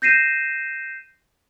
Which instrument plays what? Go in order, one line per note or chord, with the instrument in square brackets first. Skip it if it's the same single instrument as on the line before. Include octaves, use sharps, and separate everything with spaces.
[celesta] G6 A#6 C7 D#7 E7